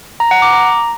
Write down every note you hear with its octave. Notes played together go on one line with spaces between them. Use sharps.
A#5
F#5
D6
A#5